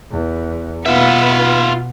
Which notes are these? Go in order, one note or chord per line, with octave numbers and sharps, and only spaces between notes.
E2
B2 B3 F4 B4 E5